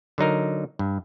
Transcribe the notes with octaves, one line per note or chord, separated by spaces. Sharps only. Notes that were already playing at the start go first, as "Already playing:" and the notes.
D3 F#3 D#4 A#4
G2